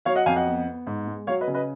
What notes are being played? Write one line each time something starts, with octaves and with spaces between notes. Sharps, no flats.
F#3 C#5 F5
D#5 F#5
F2 F5 G#5
D#5 F#5
B3
B3
G#2
G#3
F#3 C#5 F5
B4 D#5
C#3
B4 D#5